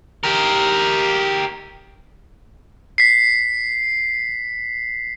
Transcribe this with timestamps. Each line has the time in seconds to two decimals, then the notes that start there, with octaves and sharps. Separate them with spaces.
0.24 G4 A#4
2.98 B6 C7